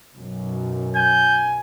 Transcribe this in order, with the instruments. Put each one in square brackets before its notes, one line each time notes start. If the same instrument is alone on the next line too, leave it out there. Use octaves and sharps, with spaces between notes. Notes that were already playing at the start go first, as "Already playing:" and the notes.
[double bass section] B1 F#2
[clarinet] G#5 [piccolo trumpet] G6